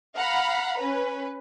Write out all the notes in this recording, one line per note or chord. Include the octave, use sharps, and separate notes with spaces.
F5 F#5 A#5 B5
C#4 B4